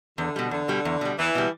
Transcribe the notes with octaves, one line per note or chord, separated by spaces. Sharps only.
E2 D3
B2 G3
E2 D3
B2 G3
E2
B2 G3
E2 E3
B2 G3